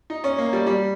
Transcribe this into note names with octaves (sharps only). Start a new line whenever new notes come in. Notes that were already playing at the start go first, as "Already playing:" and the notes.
D#4
C#4
A#3
G3
G3